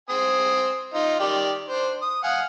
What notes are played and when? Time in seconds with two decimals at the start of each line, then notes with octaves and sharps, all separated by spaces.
0.09 C4 G#5 D#6
0.94 D#4 F4
1.20 D#3 G4 D5
1.69 D4 C5
2.02 D#6
2.24 F5 F#5 G#5